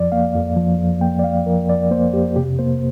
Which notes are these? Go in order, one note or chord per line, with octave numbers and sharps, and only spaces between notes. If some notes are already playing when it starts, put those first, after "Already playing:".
Already playing: F2 F3 D5
A#3 F5
F2
F3
F2
A#3 G5
D5
F2 F5
F3 A#4
F2 D5
A#3 C5
F2 G4
C3 G4
A#3 C5